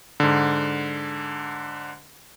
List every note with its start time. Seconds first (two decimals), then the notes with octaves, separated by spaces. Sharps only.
0.20 G#2 D3